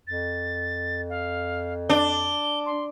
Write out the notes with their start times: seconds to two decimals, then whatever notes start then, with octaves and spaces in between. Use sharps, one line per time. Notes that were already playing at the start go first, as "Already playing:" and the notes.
0.07 F2 A6
1.10 F5
1.90 D4 G7
2.66 C6